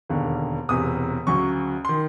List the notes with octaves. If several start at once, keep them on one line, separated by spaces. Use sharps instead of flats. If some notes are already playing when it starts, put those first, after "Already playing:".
E1 D#2 D3
E1 E2 C3 D#6
D2 C#3 F#3 C#6
D#3 C6